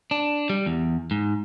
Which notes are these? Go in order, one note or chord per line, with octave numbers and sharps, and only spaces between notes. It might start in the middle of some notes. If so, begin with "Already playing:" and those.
D4
G3
E2
G#2